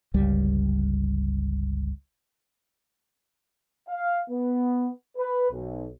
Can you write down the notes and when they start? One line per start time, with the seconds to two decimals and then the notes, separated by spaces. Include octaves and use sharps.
0.14 G1 C#2 G3
3.89 F5
4.30 B3
5.18 B4
5.51 B1